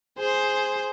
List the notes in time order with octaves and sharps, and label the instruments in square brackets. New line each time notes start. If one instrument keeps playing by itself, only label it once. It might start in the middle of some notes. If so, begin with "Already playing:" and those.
[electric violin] G#4 C5